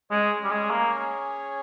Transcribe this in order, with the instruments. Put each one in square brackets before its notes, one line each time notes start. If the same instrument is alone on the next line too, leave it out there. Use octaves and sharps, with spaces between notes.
[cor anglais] G#3 [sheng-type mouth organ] C#4 G#4 C#5
[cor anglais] G3
G#3
A#3